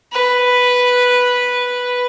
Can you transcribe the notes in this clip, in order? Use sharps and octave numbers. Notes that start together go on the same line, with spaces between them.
B4